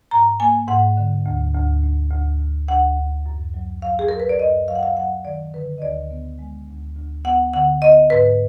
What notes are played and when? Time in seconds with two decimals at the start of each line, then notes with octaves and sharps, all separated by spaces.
0.11 G#2 A#5
0.40 A#3 G#5
0.68 G#2 F#5
0.97 D3
1.26 D2
1.54 D2
1.83 D2
2.11 D2
2.40 D2
2.68 D2 F#5
2.97 D2
3.26 F#2
3.54 F#3
3.82 F#3 F5
3.99 G#4
4.09 F#3 A#4
4.20 B4
4.29 D5
4.39 F#2 D#5
4.68 F#3 F5
4.75 F#5
4.83 F5
4.97 F#3 F#5
5.25 D#3 D5
5.54 D3 B4
5.78 D#5
5.82 D2 D5
6.11 B3
6.39 G#3
6.68 D2
6.97 D2
7.25 B3 F#5
7.54 D3 F#5
7.82 B3 D#5
8.10 G#2 B4